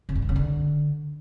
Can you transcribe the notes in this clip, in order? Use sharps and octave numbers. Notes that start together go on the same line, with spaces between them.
C#3
G2
G#2
C#3
D3